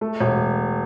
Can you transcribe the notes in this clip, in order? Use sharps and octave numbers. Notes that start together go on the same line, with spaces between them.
A3
E1